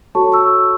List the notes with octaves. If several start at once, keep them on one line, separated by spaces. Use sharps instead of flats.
F#4 A4 C#5 A5 C#6
C#6 E6